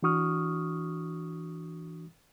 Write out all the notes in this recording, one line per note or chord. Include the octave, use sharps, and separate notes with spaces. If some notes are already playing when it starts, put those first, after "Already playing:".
E3 D4 F#4 C#6 D#6 F6